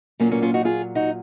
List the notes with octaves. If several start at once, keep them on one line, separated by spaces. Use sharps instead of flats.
A#2 F#3 A#3 C#4
A#3 C#4
C#4 F4
D#4 F#4
F4 G#4
D#4 F#4